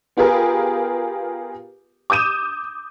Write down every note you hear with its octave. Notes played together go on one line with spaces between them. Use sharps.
B3 F4 G4 G#4 A#4 B4
D6 D#6 G6 D#7 E7